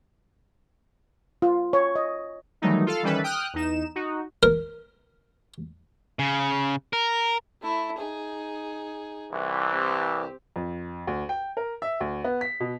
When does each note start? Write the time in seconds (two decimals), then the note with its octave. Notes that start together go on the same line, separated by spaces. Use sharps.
1.42 F4
1.73 C#5
1.96 D#5
2.62 D#3 E3 F#3 G3 A3 D#4
2.86 F4 A4 F5
3.03 D#3 E3 G3 C#4 A4 B4
3.24 G5 D#6 F6 F#6
3.53 E2 D#4 E7
3.95 D#4 F#4
4.43 A#4
6.19 C#3
6.93 A#4
7.62 A3 E4
7.98 D#4 G#4
9.31 C2 E3
9.70 C4 G4
10.56 F2
11.07 D2
11.29 G5
11.57 A#4
11.82 E5
12.01 D2
12.24 B3
12.41 B6
12.60 B2